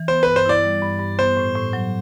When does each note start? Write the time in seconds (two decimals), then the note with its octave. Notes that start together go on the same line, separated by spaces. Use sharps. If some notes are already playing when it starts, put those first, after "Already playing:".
Already playing: E3
0.08 B3 C5
0.23 G2 B4
0.36 C5
0.46 E4 D5
0.64 G3
0.82 G2
1.00 G2
1.19 B3 C5
1.37 A2
1.56 A2
1.73 F#3